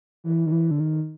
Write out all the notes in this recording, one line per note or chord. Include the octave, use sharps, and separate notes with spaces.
E3
D#3
E3
D3
D#3